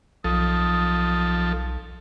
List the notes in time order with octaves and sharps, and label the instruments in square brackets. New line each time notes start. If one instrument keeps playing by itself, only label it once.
[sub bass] B1 [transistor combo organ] F3 A4 [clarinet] D#6